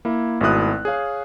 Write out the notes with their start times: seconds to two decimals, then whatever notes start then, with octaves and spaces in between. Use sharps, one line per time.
0.05 A#3 E4
0.41 G#1 B2 A3 E4 D#6 F#6
0.85 G#4 C#5 F5 G#5